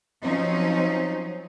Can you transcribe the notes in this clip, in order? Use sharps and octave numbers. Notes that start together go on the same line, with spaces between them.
F3 F#3 C4 C#4 D#4